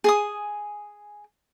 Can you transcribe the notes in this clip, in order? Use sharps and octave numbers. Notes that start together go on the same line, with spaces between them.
G#4 G#5 D#6